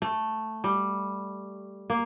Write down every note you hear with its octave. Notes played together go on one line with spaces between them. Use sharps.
A3
G3
A#3